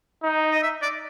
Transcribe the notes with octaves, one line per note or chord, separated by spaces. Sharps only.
D#4
D#5
E5
D5